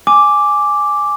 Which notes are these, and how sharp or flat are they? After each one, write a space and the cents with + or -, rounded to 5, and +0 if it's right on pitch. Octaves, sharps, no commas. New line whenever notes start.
G#5 +0 D6 +0